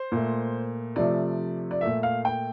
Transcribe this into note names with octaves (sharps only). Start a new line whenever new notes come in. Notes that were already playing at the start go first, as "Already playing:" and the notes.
Already playing: C5
A#2 A3
C3 F3 A3 D5
D5
A#2 A3 E5
F5
G5